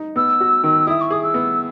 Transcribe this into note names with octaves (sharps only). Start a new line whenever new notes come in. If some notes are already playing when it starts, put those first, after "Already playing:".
Already playing: D#4
B3 E6
F#4
D#3
E4 D#6
C#6
G#4 D#6
E6
B3